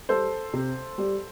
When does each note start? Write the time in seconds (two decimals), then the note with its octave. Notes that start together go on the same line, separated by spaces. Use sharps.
0.09 G3 A4 C5
0.54 C3
0.98 G3